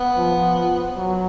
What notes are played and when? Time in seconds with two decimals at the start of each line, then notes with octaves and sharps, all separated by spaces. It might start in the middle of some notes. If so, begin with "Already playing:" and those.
Already playing: B3
0.17 F3
0.97 F#3